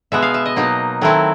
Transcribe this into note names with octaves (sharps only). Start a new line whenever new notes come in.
B2 G#3 B3 E5
F5
E5
D#5
B2 F#3 A#3 D#4
D#3 F#3 A3 C4 E4